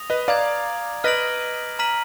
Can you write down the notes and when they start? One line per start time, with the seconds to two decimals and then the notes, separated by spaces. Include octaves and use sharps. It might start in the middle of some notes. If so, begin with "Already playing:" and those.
Already playing: D#6 A#6 F7
0.10 B4 D#5
0.28 D5 F5 A#5 D6 G#6
1.04 B4 D#5 F6 A#6 D7 F#7
1.79 A#5 F6 B6 D#7 F#7